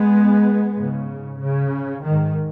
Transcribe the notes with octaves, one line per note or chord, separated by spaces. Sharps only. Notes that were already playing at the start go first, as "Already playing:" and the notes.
Already playing: G#3 B3
G#2 C#3
C#3
G#2 D#3